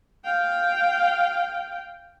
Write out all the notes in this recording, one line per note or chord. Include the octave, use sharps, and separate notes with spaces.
F5 G5